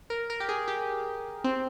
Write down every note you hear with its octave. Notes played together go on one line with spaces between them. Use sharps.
A#4
A#4
G4
G#4
G4
C4